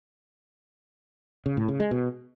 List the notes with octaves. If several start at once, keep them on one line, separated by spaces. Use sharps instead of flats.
C#3
A2
C#3
G#3
B2